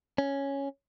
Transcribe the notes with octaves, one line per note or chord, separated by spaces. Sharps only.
C#4